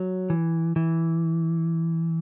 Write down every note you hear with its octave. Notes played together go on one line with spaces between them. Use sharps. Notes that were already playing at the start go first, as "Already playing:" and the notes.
Already playing: F#3
E3
E3